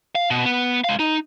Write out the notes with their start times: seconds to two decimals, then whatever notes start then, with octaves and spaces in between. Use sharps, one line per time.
0.15 F5
0.30 B2
0.45 B3
0.84 G#3 F5
0.99 D#4